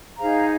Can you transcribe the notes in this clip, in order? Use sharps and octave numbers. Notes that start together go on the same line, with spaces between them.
D#4 G#4 C5 F5 A#5